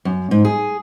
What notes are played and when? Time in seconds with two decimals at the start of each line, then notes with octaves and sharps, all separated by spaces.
0.05 F#2
0.31 G#2
0.45 G#4